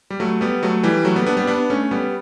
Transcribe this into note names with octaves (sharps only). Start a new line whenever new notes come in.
G3
F#3 A3
G3 B3
F#3 A3
E3 G3
F#3 A3
G3 B3
B3 D4
G3 B3
B3 D4
A3 C#4
G3 B3